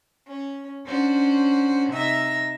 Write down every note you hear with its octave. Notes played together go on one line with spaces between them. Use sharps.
C#4
C#4 D4 F#4 C5
C3 D#4 E5 E6 A#6